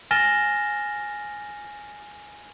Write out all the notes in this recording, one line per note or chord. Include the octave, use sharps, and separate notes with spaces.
G#5 F6 A6 A#6 E7 G7